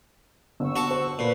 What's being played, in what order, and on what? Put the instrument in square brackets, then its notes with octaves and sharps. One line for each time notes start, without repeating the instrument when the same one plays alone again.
[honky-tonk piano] G1 [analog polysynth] C#6 E6
[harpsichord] F#4 A5
[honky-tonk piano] C5
[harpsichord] A#2 [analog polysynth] B4